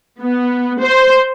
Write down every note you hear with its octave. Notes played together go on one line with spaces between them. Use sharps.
B3
C5